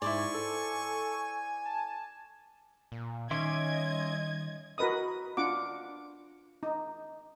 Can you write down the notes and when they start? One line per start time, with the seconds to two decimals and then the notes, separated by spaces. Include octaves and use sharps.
0.02 G#2 E4 C5 D5 G#5 C#6
0.34 A4
1.65 A5
2.92 A#2
3.31 D#3 G3 C#4 D#5 E5 C6 D6 G#6
4.78 F#4 A#4 B4 D#5 D#6
5.37 D4 F4 F#5 D6
6.63 D#4